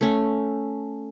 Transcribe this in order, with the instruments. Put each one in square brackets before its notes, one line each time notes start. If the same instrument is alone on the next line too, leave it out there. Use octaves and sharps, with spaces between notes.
[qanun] A3 C#4